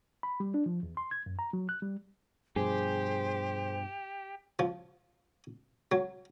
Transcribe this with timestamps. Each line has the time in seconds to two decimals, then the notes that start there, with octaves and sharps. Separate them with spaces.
0.23 B5
0.40 G3
0.54 D4
0.66 F3
0.83 E2
0.97 C6
1.11 G#6
1.26 F#2
1.39 A#5
1.53 F#3
1.69 F#6
1.82 G3
2.56 G2 B2 F3 G4 G#4 C5
4.59 F3
5.92 F#3